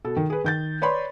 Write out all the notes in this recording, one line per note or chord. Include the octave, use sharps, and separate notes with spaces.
B2 A4
D#3
G#4 B4
D#3 G6 A6
B4 C#5 D5 B5 C6